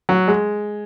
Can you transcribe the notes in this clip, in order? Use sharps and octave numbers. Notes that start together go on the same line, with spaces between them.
F#3
G#3